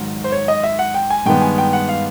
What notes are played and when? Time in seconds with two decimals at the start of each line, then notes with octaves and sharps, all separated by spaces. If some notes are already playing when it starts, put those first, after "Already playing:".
Already playing: G#2 D#3 F#3
0.24 C5
0.32 C#5
0.48 D#5
0.64 E5
0.79 F#5
0.94 G5
1.10 G#5
1.26 G2 D#3 G#3 B3 G5
1.41 G#5
1.58 G5
1.73 F#5
1.89 F5